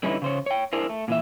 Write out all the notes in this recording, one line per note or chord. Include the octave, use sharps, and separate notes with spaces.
D3 G3 C#4 D#4 E4 B4
C#3 C5 C#5
C#5 G5
D4 E4 G#4 A#4 C5
A3
A#2 E3 E5